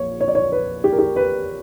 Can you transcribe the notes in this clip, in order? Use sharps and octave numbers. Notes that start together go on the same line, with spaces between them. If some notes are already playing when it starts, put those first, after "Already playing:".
Already playing: A#1 C#5
C#5
D5
C#5
B4
G4
A#4
G4
B4